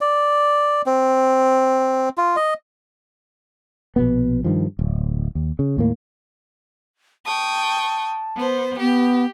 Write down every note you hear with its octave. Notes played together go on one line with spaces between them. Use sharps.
D5
C4
F4
D#5
A#1 B2 B3
G2 D#3 F3
D1
D#2
C#3
D#2 A2 A#3
G5 A5 C#6 D#6
B3 C5
B3 G4